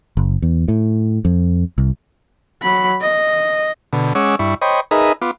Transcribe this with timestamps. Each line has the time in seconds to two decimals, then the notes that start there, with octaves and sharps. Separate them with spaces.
0.17 F#1
0.42 E2
0.68 A2
1.25 F2
1.78 C2
2.62 F#3 B5
3.01 D#5
3.93 B2 D3
4.15 G#3 C#4 C#5 F#5 D6 E6
4.39 G2 E4 C#6
4.62 C5 C#5 D#5 G5 B5
4.91 D#4 G#4 A#4 B4 D#5 E5
5.22 B3 F4 D6